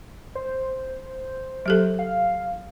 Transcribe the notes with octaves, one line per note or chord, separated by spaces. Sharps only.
C5
F#3 G4 A4
F5